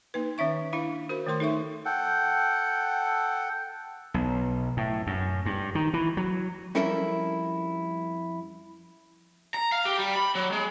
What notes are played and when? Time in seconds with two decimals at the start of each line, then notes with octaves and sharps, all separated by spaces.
0.14 A#3 D#4 B4
0.38 D#3 C#4 E5 C#6
0.73 D4 E4 F5 B5
1.09 F#4 A#4 C5 B5
1.27 D#3 A3 A#4 C6
1.40 D#4 A4 E5 C#6
1.85 A4 F#5 G5
4.14 B1
4.77 A2
5.07 F#2
5.46 G2
5.75 D#3
5.94 E3
6.17 F#3
6.75 F2 G3 C#4 E4 A4 A#4
9.54 A#5
9.72 F5
9.85 G4
9.98 G3
10.16 B5
10.35 F#3
10.52 G#3